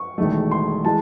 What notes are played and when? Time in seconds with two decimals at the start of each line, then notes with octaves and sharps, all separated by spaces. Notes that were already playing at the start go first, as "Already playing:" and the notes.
Already playing: C#6
0.18 E1 E2 D#3 A3
0.51 C6
0.85 E3 G#3 A5